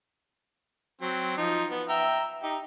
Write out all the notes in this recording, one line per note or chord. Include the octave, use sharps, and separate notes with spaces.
F#3 C4
F3 D#4
B3
E5 G5 A#5
D#4 G4